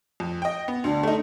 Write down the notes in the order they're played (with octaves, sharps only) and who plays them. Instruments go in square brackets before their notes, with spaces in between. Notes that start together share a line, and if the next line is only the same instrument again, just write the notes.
[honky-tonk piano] F2
D#5 G5
B3
[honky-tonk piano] D2 [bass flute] D4
[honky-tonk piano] A3 D#4